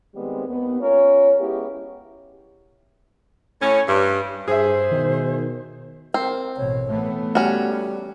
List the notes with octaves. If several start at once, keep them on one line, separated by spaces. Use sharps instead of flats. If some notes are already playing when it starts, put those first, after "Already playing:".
D#3 G3 G#3 B3 C4
D#2 B3
C#4 F4 A#4 C#5
G#3 B3 C#4 E4 G4
A2 C#4
G2
G2 G#4 C5 E5
B2 D#3
C4 A#4
A1 B2 C#5
E3 A3 B3
G3 C#4 F#4